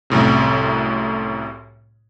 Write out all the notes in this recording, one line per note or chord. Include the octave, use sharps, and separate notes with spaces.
C2 F#2 A2 C3